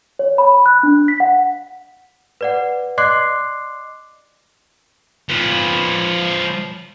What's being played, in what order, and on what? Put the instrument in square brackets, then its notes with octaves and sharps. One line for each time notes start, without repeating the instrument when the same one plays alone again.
[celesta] C#5
B5
F#6
D4
B6
F#5
B4 D5 F#5
D5 D#5 C6 D6 F#6 C7
[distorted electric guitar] F3 B4